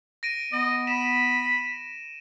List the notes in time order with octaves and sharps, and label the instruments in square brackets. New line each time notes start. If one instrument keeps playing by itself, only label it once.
[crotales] A#6 D7 D#7
[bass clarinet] B3 [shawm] D#5
[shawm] B5 [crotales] E7